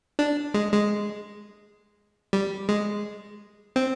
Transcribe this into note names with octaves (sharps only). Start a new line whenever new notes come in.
D4
G#3
G#3
G3
G#3
C4